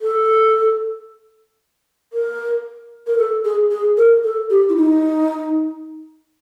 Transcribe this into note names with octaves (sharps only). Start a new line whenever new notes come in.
A4
A#4
A#4
A4
G#4
G#4
A#4
A4
G4
E4
D#4